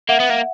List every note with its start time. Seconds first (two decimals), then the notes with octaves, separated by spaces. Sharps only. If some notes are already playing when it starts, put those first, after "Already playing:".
0.09 A#3 E5 F#5
0.20 B3
0.30 A#3